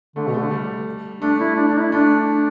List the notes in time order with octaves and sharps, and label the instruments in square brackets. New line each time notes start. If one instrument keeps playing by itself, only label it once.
[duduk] D3 [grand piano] A3
[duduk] B2
[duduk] D3 [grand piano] A3
[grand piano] G3
[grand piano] A3 [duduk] D4
[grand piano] A3 [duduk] E4
[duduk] D4
D4
E4
[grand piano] A3 [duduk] D4
[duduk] D4